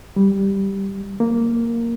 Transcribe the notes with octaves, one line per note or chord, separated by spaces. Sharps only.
G3
A#3